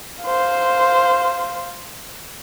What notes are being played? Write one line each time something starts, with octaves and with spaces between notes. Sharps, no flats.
C5 F5